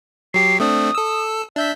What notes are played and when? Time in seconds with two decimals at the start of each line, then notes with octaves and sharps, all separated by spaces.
0.34 F#3 G4 C7
0.60 A3 C4 D4 D#6
0.95 A4 E6
1.56 D4 E5 G6 B6